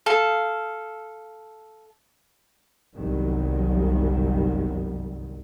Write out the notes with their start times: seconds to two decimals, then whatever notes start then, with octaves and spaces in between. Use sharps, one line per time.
0.06 A4 F5
2.95 G1 C2 F#2 D#3 F#3 G3